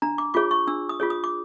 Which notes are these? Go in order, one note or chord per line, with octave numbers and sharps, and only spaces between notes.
D4 A#5
D6
F4 G#4 C#5 D6
C#6
D4 E6
D#6
F4 G#4 C#5
D#6
D6